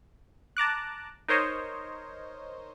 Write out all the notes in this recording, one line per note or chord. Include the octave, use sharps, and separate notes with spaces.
A5 A#5 D6 F#6
D#4 A#4 C5 C#5 D#5